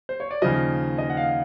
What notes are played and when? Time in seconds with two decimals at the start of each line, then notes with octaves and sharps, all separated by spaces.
0.09 C5
0.20 C#5
0.31 D5
0.42 D#2 C#3 F3 D#5
0.98 D#5
1.10 F#5
1.17 F5